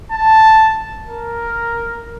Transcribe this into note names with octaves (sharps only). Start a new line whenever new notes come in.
A5
A#4